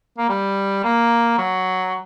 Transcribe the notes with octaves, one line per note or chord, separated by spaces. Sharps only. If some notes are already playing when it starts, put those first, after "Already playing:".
A#3
G3
A#3
F#3